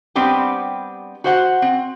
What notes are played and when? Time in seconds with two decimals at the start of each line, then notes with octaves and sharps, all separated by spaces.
0.15 G3 B3 C4 D4 G4
1.24 F#4 C5 F#5
1.62 C4